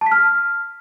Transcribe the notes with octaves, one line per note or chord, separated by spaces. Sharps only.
A5
B6
F6